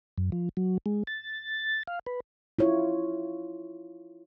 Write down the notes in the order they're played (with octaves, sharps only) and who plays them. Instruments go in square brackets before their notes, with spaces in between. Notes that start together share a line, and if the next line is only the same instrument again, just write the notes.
[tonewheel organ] F#2
F3
F#3
G#3
A6
F5
B4
[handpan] E4 F4 C#5